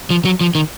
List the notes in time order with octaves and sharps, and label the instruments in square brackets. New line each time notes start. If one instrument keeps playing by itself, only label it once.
[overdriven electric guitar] F3
F#3
F3
D#3